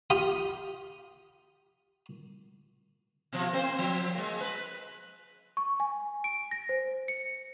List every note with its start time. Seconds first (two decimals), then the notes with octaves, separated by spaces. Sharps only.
0.10 F4 G4 B5 D#6
3.33 B2 F3
3.52 A#3 C4 C5
3.79 F3
4.15 G#3 A#3
4.41 B4
5.57 C#6
5.80 G#5
6.24 D7
6.51 A#6
6.69 C5
7.08 C#7